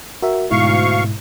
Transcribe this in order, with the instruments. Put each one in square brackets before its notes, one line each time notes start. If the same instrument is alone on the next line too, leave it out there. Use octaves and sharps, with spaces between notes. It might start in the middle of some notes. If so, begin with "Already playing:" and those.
[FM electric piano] F#4 A#4 E5
[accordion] D2 F5 C#6 [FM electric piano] G#2 B2 E4